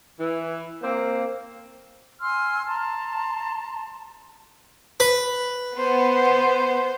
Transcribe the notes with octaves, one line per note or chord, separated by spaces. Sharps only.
E3
A#3 C4 C5
G#5 C6 E6 F6
A5 A#5 C6
B4
B3 C5